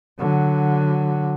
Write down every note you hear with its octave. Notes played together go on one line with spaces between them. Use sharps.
D3 F#3